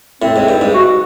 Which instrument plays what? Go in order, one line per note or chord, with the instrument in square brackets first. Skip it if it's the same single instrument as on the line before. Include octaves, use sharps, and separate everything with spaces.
[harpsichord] A2 [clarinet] C4
[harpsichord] G#2
G2
G#2
[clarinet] F#4